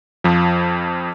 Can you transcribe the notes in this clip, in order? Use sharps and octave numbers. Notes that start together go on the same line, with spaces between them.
F2 F3